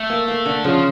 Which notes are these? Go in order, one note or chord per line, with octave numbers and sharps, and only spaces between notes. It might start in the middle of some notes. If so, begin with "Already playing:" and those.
Already playing: A3
A#3
A#3
D3
C#3 F3